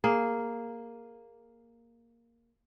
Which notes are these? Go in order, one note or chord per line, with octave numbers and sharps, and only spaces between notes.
A#3 G#4